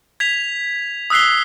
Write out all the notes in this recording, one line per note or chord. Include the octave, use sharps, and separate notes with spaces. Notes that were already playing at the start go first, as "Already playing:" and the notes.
G#6 B6 F7
D#6 E6 F#6 B6 C7 G7